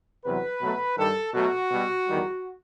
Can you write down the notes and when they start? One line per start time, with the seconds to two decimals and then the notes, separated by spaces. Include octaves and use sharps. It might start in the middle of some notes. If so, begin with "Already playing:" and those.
0.24 E2 C3 F#3 B4
0.61 B2 F#3 A3
0.97 G2 D#3 G3 A4
1.34 B2 F#3 A3 F#4
1.71 B2 G3
2.07 E2 D#3 G3